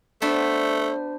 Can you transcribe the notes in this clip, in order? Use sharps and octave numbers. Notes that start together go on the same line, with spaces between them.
A3 B3 D4 F#4 C5